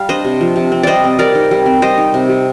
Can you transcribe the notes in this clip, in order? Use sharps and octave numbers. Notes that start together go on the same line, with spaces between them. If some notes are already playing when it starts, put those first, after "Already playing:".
Already playing: G3 F5
D4 C5 D#5
C3
F3
C3
C4
G3 C5 D5 D#5
C4
G3 A#4 D5
D#4
G3
C4
G3 C5 D#5
D#4
C3
G3